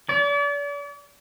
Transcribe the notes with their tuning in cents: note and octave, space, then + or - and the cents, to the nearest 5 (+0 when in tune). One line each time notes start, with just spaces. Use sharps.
D5 -40